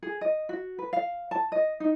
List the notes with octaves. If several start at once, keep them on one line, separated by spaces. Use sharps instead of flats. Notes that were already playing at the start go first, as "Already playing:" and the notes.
G#4
D#5
F#4
B4
F5
A5
D#5
D#4